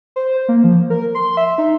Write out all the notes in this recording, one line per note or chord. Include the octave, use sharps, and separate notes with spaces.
C5
A#3
F3
A#4
C6
E5
D#4